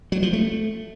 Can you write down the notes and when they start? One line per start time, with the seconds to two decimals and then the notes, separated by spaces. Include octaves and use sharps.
0.12 F#3
0.23 F3
0.33 A3